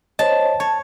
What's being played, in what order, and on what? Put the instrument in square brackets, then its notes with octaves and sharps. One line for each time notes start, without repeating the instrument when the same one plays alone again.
[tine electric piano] C5 C#5 D#5 [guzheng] A5
[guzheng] C#5 [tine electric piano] A5